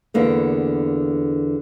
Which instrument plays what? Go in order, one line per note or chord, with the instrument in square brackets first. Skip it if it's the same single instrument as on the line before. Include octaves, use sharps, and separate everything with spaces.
[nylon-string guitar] E2 D3 A#3 B3